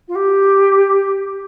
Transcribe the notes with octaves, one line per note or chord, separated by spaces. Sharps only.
F4
G4